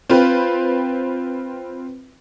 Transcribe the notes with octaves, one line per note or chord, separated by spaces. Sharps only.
C4 F4 B4